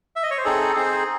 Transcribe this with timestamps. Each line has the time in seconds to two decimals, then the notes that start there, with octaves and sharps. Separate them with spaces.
0.16 E5
0.23 D#5
0.30 C#5
0.38 C5
0.45 C4 D#4 G#4 A4
0.76 C4 D#4 G#4 C5